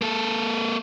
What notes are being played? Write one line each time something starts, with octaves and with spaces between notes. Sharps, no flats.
A#3 A4